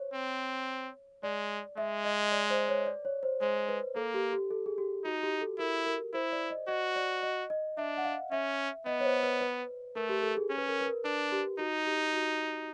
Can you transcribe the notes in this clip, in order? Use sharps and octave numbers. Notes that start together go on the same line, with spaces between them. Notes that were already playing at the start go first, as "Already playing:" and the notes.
Already playing: C5 C#5
C4
G#3 D5
G#3 E5
D#5
D5
C5
C#5
D5
C#5
C5
G#3 C5
B4
A#3 A4
G4
G4
A4
G#4
G4
D#4 F#4
G4
A4
E4 A#4
A#4
E4 C5
D5
D#5
F#4 D#5
D5
D#5
D#5
D4 E5
F#5
F5
C#4 E5
B3 D#5
C#5
C5
B4
B4
A3 A#4
G4
A4
G#4
C#4
B4
A#4
B4
A#4
D4 B4
G4
D#4 F#4
G4
F#4